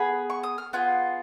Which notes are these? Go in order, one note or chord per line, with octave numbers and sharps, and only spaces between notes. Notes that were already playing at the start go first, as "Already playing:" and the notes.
Already playing: B3 G#4 B5
C#6
D#6
F6
B3 F4 G#4 F#6